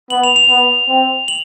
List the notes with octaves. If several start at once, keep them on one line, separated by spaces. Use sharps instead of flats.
B3 F#7
F7
F7
B3
C4
F#7